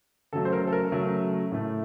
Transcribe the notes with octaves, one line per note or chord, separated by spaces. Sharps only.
C#3 F#3 A3 A4
C5
A#4
A4
A#4
C#3 F#3 A3
A2 A3